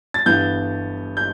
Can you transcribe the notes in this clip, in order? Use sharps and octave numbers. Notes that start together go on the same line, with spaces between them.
A6
G1 G2 E3 B3 G6
G6